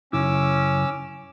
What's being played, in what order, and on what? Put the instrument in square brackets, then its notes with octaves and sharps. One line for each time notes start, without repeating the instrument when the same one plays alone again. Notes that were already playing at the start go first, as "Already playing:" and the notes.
[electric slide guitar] F#2 C#3 E4 [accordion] C#4 D6 E6